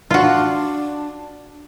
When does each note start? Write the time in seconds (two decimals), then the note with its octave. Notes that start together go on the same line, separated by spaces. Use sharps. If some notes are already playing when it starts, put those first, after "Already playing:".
0.11 D4 F4 F#4